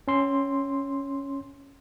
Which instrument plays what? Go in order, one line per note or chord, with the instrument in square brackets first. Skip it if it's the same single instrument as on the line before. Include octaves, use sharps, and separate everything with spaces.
[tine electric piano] C#4 C6